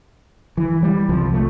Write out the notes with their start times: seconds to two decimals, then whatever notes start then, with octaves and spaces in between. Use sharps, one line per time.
0.57 E3
0.83 G3
1.08 C2 C3 F3
1.34 A3